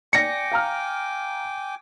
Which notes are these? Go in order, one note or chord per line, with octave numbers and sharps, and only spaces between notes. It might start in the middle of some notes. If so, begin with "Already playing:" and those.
D5 G5 G#5 D6 A#6 C#7
F5 A#5 F6